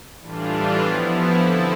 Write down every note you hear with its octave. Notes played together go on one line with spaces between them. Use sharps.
A2 E3 G3 D4 F4
F3 B3 E4
D3 F3 C4 E4 A4